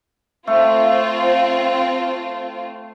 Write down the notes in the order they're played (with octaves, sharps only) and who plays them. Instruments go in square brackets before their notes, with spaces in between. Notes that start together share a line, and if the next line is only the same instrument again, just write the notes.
[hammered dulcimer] A3 [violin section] C4 F4